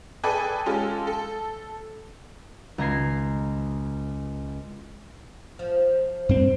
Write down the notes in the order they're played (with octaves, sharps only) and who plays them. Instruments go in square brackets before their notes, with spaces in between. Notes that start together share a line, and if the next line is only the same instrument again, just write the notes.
[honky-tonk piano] G#4 A4 B4 D5 G5 G#5
G#3 C#4 F4 G4 A4
A4
[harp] C#2 D#5 A#5 B5 G#6 C7
[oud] F3
[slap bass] G2 C4